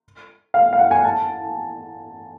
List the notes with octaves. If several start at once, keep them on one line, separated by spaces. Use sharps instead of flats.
F5
F5
F#5
G#5
A5